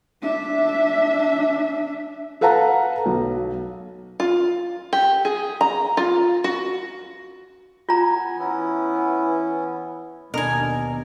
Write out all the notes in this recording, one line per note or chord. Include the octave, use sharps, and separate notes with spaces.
D4 E5
A4 B4 F5 F#5 A5 A#5
B1
F4
G4
G#4
A#5
F4
F#4
B3 F4 G#5 A#5
E3 B3 C#4 E4
D#2 B2 D4 A#4 D#5 G#5